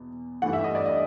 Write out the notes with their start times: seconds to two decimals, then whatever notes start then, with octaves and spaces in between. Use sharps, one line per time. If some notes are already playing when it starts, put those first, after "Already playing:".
Already playing: E2 B2
0.42 G2 E3 A3 F#5
0.53 E5
0.64 D#5
0.75 D5
0.86 D#5